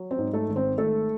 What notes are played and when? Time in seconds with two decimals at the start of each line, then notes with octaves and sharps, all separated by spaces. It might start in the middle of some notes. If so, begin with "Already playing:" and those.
Already playing: F#3
0.11 C4 C5
0.18 G#2
0.33 A3 A4
0.49 G#1
0.56 C4 C5
0.78 G#1 A3 A4